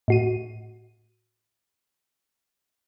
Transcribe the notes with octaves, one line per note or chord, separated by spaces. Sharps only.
A2 F#4 D#7